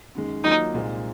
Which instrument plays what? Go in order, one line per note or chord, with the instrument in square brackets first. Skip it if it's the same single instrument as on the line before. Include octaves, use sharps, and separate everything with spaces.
[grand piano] F#2 D#3 G#3
[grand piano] D#3 F#3 A#3 F4 [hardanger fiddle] D#4
[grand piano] C2 A#2 G#3 C4